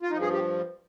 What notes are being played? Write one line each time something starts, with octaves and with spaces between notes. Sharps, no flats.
F4
G2 F3 D#4
G#4
G4